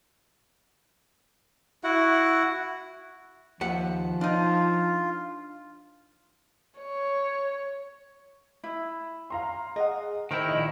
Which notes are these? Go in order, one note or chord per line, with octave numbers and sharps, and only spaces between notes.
E4 F#4 F#5
D#2 F3 E5 F#5
D4 D#4 F4
C#5
E4
F5 A#5 C6
G#4 D#5 F#5
D#3 E4 A#4 C5 G5
A#1 D#5